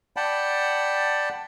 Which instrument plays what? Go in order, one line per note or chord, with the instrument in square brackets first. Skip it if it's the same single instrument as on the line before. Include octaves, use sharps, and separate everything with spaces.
[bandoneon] D5 F#5 G5 A5 B5